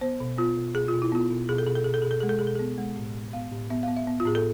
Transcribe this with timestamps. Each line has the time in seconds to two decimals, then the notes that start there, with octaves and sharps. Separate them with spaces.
0.01 B3 C5
0.20 B2
0.38 B3 F4
0.57 B2
0.75 B2 G#4
0.88 F4
0.94 B2
1.02 E4
1.12 B3 F4
1.30 B2
1.49 B2 G#4
1.58 A4
1.67 B2 G#4
1.76 A4
1.84 B2 G#4
1.94 A4
2.02 B2 G#4
2.11 A4
2.21 G#3 G#4
2.29 A4
2.39 B2 G#4
2.47 A4
2.55 B3 G#4
2.78 G#3
2.96 A2
3.14 A2
3.33 B3 F5
3.51 A2
3.70 B3 E5
3.83 B3 F5
3.97 E5
4.07 B3
4.20 F4
4.25 A2 G#4
4.35 A4